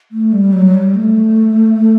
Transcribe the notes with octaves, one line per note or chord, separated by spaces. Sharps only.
A3
G3
F#3
G3
A3